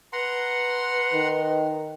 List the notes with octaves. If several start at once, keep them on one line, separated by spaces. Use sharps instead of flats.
B4 F#5 A#5 C6
D#3